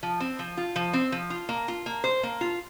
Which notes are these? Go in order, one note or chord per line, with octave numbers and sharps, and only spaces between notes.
F3
C4
F3
F4
F3
C4
F3
F4
A#3
F4
A#3
C5
A#3
F4